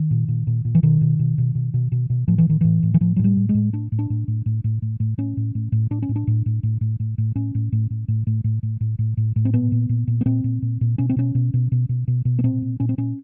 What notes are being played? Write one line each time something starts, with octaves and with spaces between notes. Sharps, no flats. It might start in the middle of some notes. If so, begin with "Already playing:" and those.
Already playing: D#3
A#2
A#2
A#2
A#2
E3
B2 D#3
B2
B2
B2
B2
B2
B2
B2
A2 F3
E3
A2 D#3
A2 E3
A2
E3
A2 F3
F#3
A2
G3
A2
G#3
A2
A2 D4
A2
D4
A2
A2
A2
A2
A2
A2
A2 C#4
A2
A2
A2
A2 D4
C#4
A2
D4
A2
A2
A2
A2
A2
A2
A2 C#4
A2
A2
A2
A2
A2
A2
A2
A2
A2
A2
A2
C4
A#2 B3
A#2
A#2
A#2
B3
A#2 C4
A#2
A#2
A#2
B2 C#4
C4
B2 C#4
B2
B2
B2
B2
B2
B2
B3
A#2 C4
A#2
A#2 C#4
C4
A#2 C#4